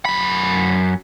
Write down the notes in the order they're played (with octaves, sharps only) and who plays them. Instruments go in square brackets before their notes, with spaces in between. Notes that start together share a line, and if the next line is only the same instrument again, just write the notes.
[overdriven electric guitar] F#2 B5